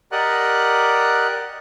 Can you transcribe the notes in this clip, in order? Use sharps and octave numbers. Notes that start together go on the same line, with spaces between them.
G4 A#4 D5 D#5 F#5 F#6